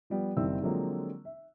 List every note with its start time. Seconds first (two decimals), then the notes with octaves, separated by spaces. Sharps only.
0.10 F3 G3 B3
0.37 F#1 D#3 G3 C4 E4 E6
0.62 D3 F3 F#3 G#3 A#3 C4
1.25 E5